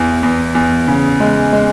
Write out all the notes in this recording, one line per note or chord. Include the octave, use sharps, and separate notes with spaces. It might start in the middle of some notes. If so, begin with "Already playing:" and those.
Already playing: E2 E3
E2
E2
C#3
G#3
G#3